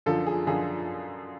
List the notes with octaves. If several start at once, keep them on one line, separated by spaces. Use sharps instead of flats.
F#2 D3 F3 A4
G#4
F#2 D3 F3 G#4